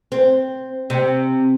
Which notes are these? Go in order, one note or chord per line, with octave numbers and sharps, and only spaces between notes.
C4
C3